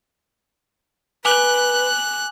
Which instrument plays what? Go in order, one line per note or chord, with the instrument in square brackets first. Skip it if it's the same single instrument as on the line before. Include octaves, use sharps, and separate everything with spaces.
[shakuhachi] B4 [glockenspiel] G#5 D6 G7 [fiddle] F#6